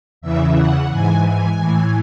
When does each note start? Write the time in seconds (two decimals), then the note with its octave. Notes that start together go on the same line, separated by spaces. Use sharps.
0.22 E2 C#3 E3 E5
0.55 F#5
0.90 G#2 E3 G#5
1.26 G#5
1.59 A2 E3